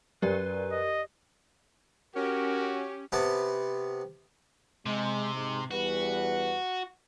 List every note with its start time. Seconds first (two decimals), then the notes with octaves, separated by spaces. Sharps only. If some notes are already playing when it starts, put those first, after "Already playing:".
0.22 F#2 G4 A#4 B4 D5
0.72 D#5
2.16 C#4 F#4 G4 A#4
3.12 C3 B3 A5
4.86 C3 G#3
5.34 G#2 G#3
5.71 E2 G3 F#4 B4